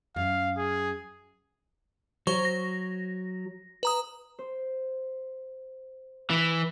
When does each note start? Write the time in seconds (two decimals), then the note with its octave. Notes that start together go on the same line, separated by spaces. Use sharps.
0.16 F#2 F5
0.58 G#4
2.27 F#3 C5 C#6
2.45 A#6
3.83 B4 A#5 D#6
4.39 C5
6.30 E3